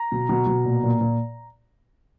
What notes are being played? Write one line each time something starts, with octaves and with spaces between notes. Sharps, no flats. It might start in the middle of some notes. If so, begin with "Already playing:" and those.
Already playing: A#5
B2
B2
B2
A#2
A#2
A#2